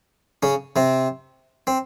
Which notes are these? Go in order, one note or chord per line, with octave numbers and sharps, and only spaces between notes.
C#3 C#4
C3 C4
C4